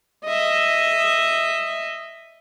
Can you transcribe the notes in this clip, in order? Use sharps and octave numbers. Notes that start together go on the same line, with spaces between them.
D#5 E5